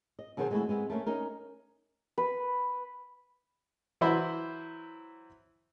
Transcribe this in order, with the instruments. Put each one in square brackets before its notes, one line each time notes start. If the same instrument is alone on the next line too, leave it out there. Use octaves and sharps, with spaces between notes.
[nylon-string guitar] D#5
B2 D#3 F#3 G#4 B4 C5
G#3 A3 C4 C#4 E4 F#4
G#3 B3 C4
A3 A#3 C#4
C#4 D#4 A#4
[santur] B4
[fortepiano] E3 F#3 E4 C5 B5